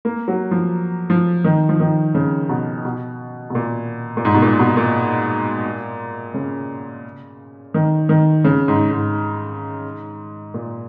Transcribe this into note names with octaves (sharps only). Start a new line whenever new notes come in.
A#3
F#3
F3
F3
D#3
F3
D#3
C#3
B2
B2
B2
A#2
A#2
G#2
B2
A#2
B2
A#2
C#3
D#3
D#3
C#3
G#2
G#2
A#2